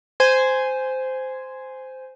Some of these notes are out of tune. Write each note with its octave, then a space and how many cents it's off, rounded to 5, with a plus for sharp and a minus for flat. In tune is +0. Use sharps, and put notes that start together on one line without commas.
C5 -10 G#5 +0